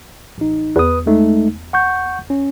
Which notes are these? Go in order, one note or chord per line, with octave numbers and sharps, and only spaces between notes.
A1 D#4
E2 B4 D#6
G#3 A3 D#4
F#5 C#6 G6
C#4